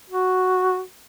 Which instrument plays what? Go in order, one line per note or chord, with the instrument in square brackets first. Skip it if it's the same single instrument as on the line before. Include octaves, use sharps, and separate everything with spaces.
[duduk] F#4